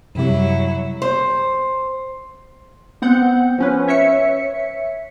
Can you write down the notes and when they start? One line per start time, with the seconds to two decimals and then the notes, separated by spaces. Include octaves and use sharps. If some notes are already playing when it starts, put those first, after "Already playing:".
0.15 F#2 C3 F#3 G3 E4
1.02 C5
3.02 B3 C4 F#5 G6
3.58 F3 C#4 B4
3.88 C#5 E5 B6 C#7